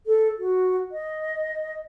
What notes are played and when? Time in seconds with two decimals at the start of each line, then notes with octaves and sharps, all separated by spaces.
0.06 A4
0.39 F#4
0.92 D#5